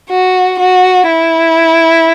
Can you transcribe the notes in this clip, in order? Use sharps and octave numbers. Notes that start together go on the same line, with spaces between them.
F#4
F#4
E4